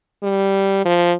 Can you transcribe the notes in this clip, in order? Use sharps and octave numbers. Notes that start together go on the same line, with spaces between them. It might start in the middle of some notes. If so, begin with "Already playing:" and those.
G3
F3